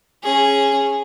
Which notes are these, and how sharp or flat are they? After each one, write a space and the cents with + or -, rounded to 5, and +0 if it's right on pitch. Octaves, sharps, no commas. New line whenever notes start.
C#4 -10 G#4 +0